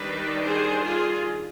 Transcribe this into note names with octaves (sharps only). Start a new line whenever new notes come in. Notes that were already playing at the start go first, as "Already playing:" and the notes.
Already playing: D#3 G3 D4 B4 D5
G#4 C5
F4 G#4